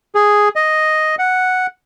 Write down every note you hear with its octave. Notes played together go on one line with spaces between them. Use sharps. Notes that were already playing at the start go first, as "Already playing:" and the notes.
G#4
D#5
F#5